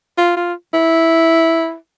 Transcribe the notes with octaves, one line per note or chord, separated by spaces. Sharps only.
F4
F4
E4